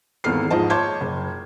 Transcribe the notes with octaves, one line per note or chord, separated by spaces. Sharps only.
G#1 E2 A#3 A4 F6 C7
G#2 F3 D#5 A5
C#5 A5 C6 D6 G6 G#6
F#1